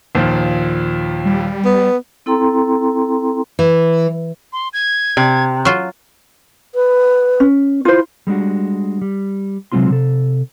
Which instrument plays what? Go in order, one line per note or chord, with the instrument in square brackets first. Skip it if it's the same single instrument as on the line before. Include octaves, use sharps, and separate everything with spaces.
[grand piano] D#2 A#2 F3
[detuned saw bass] G3
[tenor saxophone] B3
[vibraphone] C4 E4 A4 G5 A#5 C6
[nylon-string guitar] E3
[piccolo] C6
G#6
[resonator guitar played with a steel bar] C3
[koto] F#3 F4
[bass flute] B4
[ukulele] C#4
[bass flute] E4 [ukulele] F4 C5
[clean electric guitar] G3 G#3 D4 F#4
G3
C3 F#3 G#3 C4 F4 C6
C3 A4